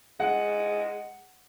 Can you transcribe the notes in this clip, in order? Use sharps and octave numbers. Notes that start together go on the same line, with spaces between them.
G#3 F#5